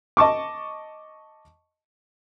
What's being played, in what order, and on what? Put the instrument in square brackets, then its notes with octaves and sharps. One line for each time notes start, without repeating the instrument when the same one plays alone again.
[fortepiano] D#5 A5 C#6 D6